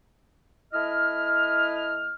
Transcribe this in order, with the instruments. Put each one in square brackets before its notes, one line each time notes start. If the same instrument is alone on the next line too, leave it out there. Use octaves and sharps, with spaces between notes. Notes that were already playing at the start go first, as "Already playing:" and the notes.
[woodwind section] A3 E4 D#5 F6